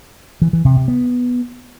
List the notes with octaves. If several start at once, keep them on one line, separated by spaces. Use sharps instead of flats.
E3
E3
C3
C3
B3